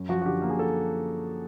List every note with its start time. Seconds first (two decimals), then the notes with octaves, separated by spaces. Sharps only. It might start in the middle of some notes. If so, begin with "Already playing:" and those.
Already playing: F#2
0.09 F3 F#4
0.22 F#4
0.25 D3 G4
0.42 A#3
0.49 G#4
0.59 A4